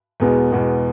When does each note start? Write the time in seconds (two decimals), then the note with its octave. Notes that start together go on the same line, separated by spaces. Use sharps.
0.20 E2 B2 G#3 B3
0.52 E2 B2 G#3 B3